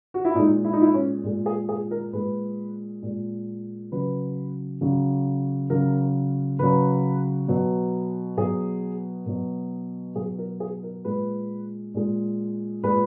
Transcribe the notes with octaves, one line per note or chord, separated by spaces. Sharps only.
F#4
E4
A#2 G#3 D#4
E4
D#4
E4
C#4
A#2 G#3
G#4
G#4
A#4
A#2 G#3 B4
A#2 G#3
C#3 F#3 B4
C#3 F#3
C#3 F#3 A#4
C#3 F#3 B4
B2 F#3
B2 F#3 G#4
B2 F#3
B2 F#3 G#4
A#4
G#4
A#4
A#2 G#3 B4
A#2 G#3
A#2 G#3 B4